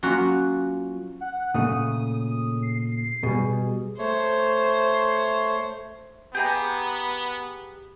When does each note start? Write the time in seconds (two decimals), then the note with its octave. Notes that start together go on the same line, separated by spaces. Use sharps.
0.03 F#3 A#3 C#4 F4 F#4 F#5
1.21 F#5
1.55 A#2 C#3 A3 D#6
2.62 C7
3.23 B2 G3 G#4
3.99 A3 C5 C#5
6.35 B3 G4 G#4 A#5